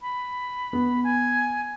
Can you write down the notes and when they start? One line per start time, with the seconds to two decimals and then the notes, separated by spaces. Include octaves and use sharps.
0.01 B5
0.73 B3
1.04 G#5